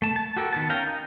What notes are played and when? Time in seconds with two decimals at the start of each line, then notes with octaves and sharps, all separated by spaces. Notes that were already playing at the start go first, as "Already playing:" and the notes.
0.02 A3 A5
0.16 A5
0.36 F#4 G4 A4 A#4
0.53 D#3 B3 A5
0.70 C#4 A#4 F5 G5 A#5
0.87 D#4